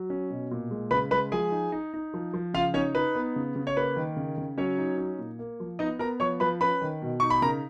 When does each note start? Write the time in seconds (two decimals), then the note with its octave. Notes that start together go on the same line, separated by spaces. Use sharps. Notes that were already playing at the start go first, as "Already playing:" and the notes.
Already playing: F#3
0.10 C#4
0.30 B2
0.51 A#2
0.71 G#3
0.91 C#3 B4 B5
1.11 G#3 B4 B5
1.32 F3 G#4 G#5
1.52 D#4
1.72 D#4
1.94 D#4
2.14 F3
2.34 F3
2.54 C#3 F4 F5
2.74 C#4 D#4 C#5
2.95 D#4 B4
3.15 B3
3.36 C#3
3.56 C#3
3.67 C#5
3.76 A#3 B4
3.96 D#3
4.17 C#3
4.38 C#3
4.58 F#3 C#4 C#5
4.78 D#4
4.98 C#4
5.19 A#2
5.39 A#3
5.60 F3
5.79 B3 D#4 D#5
5.99 B3 A#4 A#5
6.20 F3 C#5 C#6
6.40 F3 B4 B5
6.60 C#4 B4 B5
6.81 D#3
7.02 B2
7.20 D#4 C#6
7.30 B5
7.42 C#3 A#4 A#5